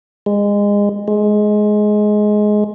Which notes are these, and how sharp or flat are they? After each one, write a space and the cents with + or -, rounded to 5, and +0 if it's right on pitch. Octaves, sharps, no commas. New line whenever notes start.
G#3 -25
G#3 +15